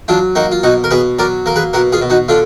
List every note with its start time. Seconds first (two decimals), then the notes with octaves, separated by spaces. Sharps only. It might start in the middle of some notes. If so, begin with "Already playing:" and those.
0.08 F#3 D4 F4
0.35 A#3 D#4 F#4
0.52 F4
0.63 B2 D#4 F#4
0.84 A#4
0.91 B2 G#4 B4
1.19 F#3 A#4 D5
1.46 A#3 A#4
1.56 G#4 B4
1.73 B2 F#4 A#4
1.92 F4 G#4
2.01 B2
2.10 D#4 F#4
2.28 D3 D4 F4